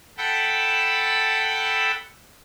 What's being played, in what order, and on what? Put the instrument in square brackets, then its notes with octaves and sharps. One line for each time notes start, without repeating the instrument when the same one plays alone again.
[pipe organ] A4 F#5 G5 A5 B5 E6